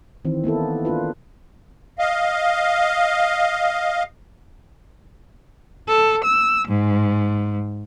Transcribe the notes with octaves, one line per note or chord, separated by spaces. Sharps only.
D#3 E3 C4
A#3 B3 E4 A4
A#3 D4 F4 B4
D#5 F5
A4
E6
G#2